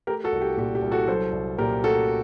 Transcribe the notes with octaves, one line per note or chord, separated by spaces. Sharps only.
A3 G4 A#4
F#4 A4
C2
G4
A#2 G4
G4
C2
F#4 A4
F#3 A4 C5
C2
A#2 G4 A#4
A3 F#4 A4